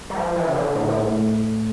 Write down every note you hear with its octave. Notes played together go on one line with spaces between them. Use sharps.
G3
F3
E3
C#3
D3
A2
A#2
A2